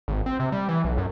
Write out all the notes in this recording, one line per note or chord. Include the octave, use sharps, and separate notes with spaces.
G#1
C4
C3
G3
E3
B1
F#2